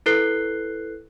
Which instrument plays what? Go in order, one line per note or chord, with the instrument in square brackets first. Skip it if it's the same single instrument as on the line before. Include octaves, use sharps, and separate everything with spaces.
[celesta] E4 A4 B4 F#6 C7 G7